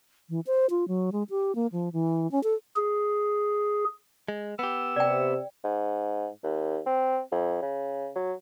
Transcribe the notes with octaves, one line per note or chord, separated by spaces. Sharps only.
E3
C5
F4
F#3
G#3
G4
A#3
F3
E3
C#4
A4
G#4
G#3
B3 G4 E6
C3 D5 G5
G#2
D#2
C4
F2
C#3
F#3